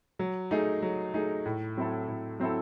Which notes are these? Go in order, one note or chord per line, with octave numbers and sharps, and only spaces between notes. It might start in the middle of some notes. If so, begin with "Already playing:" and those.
F#3
A3 D#4 G#4
F#3
A3 D#4 G#4
A2
F#3 C4 E4 A4
A2
F#3 C4 E4 A4